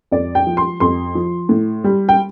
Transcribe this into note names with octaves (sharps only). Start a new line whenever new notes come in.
F2 D5
G5
F3
C6
F2 C6
F3
A2
G3
G5